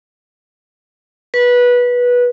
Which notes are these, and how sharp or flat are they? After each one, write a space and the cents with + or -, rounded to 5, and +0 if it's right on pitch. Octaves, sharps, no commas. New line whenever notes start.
B4 -15